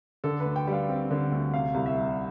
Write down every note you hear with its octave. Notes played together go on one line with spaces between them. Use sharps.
D3 A4
B4
D2
G5
G3
F5
C4
D3
D2
C3 F5
C2
E5
G3